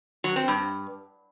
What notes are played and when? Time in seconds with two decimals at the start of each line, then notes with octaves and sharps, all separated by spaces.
0.24 F#3
0.36 C4
0.48 G2